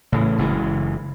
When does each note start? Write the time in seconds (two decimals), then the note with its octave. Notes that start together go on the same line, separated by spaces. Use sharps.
0.12 A2 C#3 E3
0.38 F#1 C#3 E3 G#3